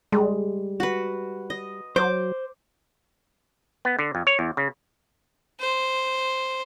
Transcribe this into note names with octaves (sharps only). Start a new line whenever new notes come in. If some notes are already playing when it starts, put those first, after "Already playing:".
G3 G#3
F#4 B4
D#5
F#3 C5 D6
B3
D3
F2
C#5
E2
C#3
C5